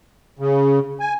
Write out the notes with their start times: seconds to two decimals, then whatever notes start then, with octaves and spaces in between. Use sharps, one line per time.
0.39 C#3
1.00 G#5